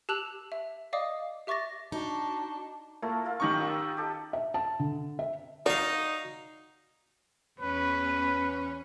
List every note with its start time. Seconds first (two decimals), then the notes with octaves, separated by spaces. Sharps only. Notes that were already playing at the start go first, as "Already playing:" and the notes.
0.09 G4 A5 E6 F#6 F7 F#7
0.52 E5
0.93 D5 D#5 F5 D6 D#6
1.47 G4 E5 C#6 D6 A6 A#6
1.92 D4 D#4 F#4 A5
3.02 A3 A#3 E4 F4
3.25 E4 F4 A#4
3.40 D#3 C#4 D#4 G4 C#6 D#6
3.60 F4 E6
3.97 G4 A4 D#5
4.33 E5
4.54 A5
4.79 D3
5.19 E5
5.66 D#4 F#4 D5 F5
7.60 E2 C#4 B4